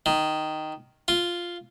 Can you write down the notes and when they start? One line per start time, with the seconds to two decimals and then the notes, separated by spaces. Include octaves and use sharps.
0.06 D#3
1.08 F4